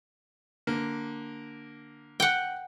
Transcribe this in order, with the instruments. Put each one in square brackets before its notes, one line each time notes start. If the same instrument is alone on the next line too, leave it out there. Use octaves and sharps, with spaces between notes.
[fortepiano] D3 A#3
[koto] F#5 G5